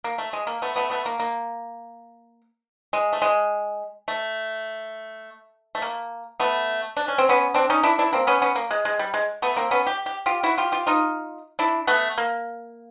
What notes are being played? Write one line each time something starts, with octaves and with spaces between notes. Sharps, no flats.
A#3
A3
G#3
A#3
A3 B3
A3 B3
A3 B3
A#3
A#3
G#3
A3
G#3
A3
A3
A#3
A3 B3
D4
C#4
C4
B3 C#4
C4 D4
C#4 D#4
D4 E4
D4 E4
A#3 C4
B3 C#4
B3 C#4
A#3
G#3
G#3
G3
G#3
A3 B3
A#3 C4
B3 C#4
G4
G4
F4 G4
E4 F#4
F4 G4
F4 G4
D#4 F4
D4 E4
A3 B3
A#3